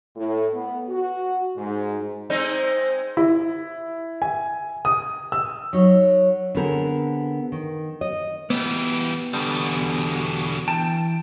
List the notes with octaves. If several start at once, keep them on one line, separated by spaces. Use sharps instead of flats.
A2
B3
F#4
G#2
G#3 C4 D#4
E4
G#5
D#6
E6
F#3 D#4
D3 B3 C4 G#4 A#4
D#3
D#5
E3 G3 B3
E2 B2 D3 G3
E3 G5 A5